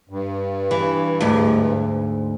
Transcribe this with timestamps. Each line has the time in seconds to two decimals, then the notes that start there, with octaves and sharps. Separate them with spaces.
0.09 G2
0.71 E3
1.21 D2 G#2